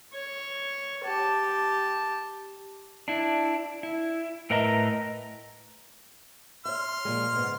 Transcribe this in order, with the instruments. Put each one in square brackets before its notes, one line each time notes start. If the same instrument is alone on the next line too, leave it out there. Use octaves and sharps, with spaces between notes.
[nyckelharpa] C#5
G4 A5
[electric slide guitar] D4 E4
E4
A2 A#4 B4 D#5 E5 A#5
[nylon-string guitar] C#5 E5 [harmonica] C6 F6
[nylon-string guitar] A#2 F3 G#3
G#2 C#3 B3